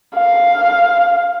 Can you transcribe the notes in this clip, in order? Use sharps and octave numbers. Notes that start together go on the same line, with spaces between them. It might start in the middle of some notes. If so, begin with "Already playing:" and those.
F5